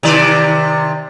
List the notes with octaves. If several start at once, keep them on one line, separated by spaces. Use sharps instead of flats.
C3 D#3 D5